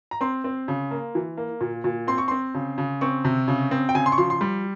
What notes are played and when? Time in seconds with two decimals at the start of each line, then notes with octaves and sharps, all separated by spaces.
0.11 A#5
0.21 C4 C6
0.44 C4
0.68 C#3
0.91 A#3
1.15 E3
1.37 A#3
1.61 A#2
1.84 A#2
2.07 C4 C6
2.18 C#6
2.28 C4 C6
2.54 C#3
2.78 C#3
3.01 C4 C#6
3.25 C3
3.48 C#3
3.71 C4
3.89 G5
3.94 C#3 G#5
4.06 C6
4.12 C#6
4.18 F3 C6
4.30 C6
4.41 G3